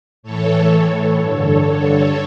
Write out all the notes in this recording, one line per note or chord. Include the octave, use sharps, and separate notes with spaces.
A2 E3 A4 C#5
G2 D3